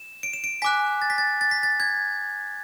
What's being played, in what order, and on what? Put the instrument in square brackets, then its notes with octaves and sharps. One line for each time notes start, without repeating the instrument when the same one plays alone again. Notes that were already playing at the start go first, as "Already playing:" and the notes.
Already playing: [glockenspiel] E7
D7
E7
D7
G#5 D6 F#6 B6
A6
B6
A6
A6
B6
A6
G#6